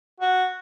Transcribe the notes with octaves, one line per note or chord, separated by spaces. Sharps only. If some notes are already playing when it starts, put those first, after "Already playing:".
F#4